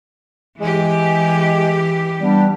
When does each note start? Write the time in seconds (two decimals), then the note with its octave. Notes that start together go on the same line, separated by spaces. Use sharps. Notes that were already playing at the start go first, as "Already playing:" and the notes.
0.60 E3 G#3 G4
2.21 G3 B3 D4